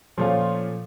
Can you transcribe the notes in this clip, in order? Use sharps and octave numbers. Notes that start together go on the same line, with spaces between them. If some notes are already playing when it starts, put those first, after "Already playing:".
A#2 F3 A3 C#4 F4